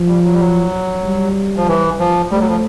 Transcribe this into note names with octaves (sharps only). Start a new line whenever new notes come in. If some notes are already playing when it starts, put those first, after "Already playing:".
Already playing: F3
G3
F#3
G3
F#3
G3
F3
E3
F3
G3 A3
F#3
F3